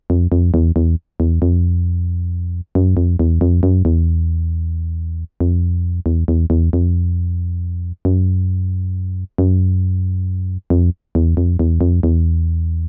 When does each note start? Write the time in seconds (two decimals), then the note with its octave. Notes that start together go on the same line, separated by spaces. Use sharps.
0.10 F2
0.32 F2
0.54 E2
0.76 E2
1.20 E2
1.42 F2
2.75 F#2
2.97 F2
3.19 E2
3.41 F2
3.63 F#2
3.85 E2
5.40 F2
6.06 E2
6.28 E2
6.50 E2
6.73 F2
8.05 F#2
9.38 F#2
10.70 F2
11.15 E2
11.37 F2
11.59 E2
11.81 F2
12.03 E2